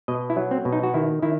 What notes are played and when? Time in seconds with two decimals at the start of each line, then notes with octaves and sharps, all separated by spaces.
0.08 B2 D#5
0.30 E4
0.37 F#3
0.51 C4
0.65 B2
0.73 D#4
0.83 F#4
0.94 D#3 E4
1.22 D#3 E4